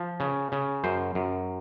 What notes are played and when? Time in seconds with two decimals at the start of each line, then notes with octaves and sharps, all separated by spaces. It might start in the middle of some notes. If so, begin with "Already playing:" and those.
Already playing: F3
0.20 C#3
0.52 C#3
0.84 F#2 C5
1.15 F#2